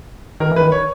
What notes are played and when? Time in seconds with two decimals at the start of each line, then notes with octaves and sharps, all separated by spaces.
0.40 D#3 A#4
0.51 E3
0.56 B4
0.61 D#3
0.72 C#5